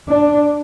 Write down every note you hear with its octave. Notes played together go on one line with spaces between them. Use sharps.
D4